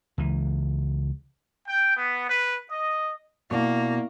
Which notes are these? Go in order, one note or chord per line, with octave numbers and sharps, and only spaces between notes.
C#2 E3
G5
B3
B4
D#5
B2 A#3 E4 D5 C#6